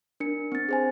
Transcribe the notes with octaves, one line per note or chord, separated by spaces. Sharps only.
D4 A#4 C#7
C4 A6
G#4 C5 G#5